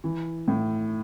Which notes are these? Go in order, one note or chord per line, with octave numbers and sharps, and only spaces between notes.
E3
A2